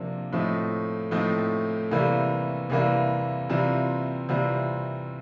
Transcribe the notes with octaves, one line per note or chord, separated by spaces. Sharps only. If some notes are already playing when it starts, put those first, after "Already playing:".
Already playing: C3 F3 A#3 D4
A2 F3 A3 C4 D#4
A2 F3 A3 C4 D#4
C3 E3 G3 A#3
C3 E3 G3 A#3
C3 E3 G3 C4 F4
C3 E3 G3 C4 F4